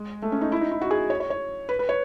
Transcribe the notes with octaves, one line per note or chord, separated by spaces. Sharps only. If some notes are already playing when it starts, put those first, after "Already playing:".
Already playing: G#3
A3
C#4
D#4
E4
D#4
E4
F#4
G#4
C#5
C#5
C#5
B4
B4
C#5